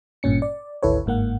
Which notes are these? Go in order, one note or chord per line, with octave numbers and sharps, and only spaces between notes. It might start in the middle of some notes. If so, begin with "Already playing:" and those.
G#1 G2 A#2 C#4 C#7
D5
G#1 D2 E4 A4 B4 C#5
G1 G#2 A#3 F#5